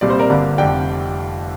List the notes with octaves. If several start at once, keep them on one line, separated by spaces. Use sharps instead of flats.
C2 A#2 G3 C4 D5
C5
A#4 D5
G1 G2 D3 A#3 D4
F1 F2 D3 G3 D5 G5